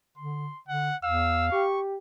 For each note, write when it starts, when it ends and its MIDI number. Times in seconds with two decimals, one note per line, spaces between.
0.17 0.48 50
0.17 0.60 84
0.68 0.91 50
0.68 0.96 78
1.04 1.50 40
1.04 1.66 77
1.04 1.47 88
1.52 1.95 67
1.52 1.80 85